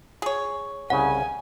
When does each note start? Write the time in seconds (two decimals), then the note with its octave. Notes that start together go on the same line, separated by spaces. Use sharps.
0.22 G#4 C#5
0.90 C2 C#3 F#5 G#5